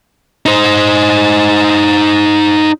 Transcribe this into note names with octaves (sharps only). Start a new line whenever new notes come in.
D#4 C5